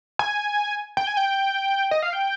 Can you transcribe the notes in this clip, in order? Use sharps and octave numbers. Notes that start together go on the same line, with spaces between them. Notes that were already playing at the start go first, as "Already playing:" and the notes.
G#5
G5
G#5
G5
D#5
F5
G5